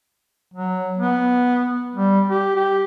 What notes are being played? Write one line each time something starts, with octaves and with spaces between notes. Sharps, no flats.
F#3
B3
G3
G4
G4